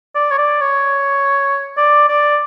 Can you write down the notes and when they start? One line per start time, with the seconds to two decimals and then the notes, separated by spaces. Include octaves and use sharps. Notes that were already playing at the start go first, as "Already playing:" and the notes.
0.15 D5
0.31 C#5
0.38 D5
0.61 C#5
1.78 D5
2.09 D5